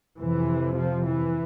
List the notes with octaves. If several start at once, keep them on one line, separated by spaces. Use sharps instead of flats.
F2 C3 E3
F3
E3